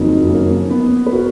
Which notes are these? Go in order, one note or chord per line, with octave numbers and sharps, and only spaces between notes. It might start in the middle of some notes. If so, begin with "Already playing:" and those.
Already playing: F#1 F2 D#3 F#3
A#3 C#4
B3
B4
F#4 A#4